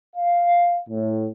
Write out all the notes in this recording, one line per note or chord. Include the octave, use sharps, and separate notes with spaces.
F5
A2